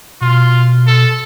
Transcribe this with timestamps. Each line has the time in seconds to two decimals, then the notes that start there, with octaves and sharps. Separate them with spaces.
0.21 B2 F4
0.87 A4